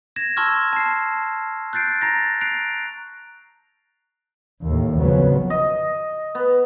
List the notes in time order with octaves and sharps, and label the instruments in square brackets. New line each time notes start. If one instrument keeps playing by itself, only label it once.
[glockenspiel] G#6 A#6 E7
A5 C6 C#6 E6 F6 G#6
A5 C7
F#6 G6 A6 C7 D7
A#5 A6 A#6
F#6 C7 D7 F7
[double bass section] D#2 A2
G#1 F2 C#3 F3 F#3 B3
[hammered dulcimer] D#5
B3